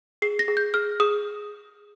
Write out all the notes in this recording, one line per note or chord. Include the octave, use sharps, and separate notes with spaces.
G#4 C7
A#6
G#4
G6
G#4 F6
G#4 D#6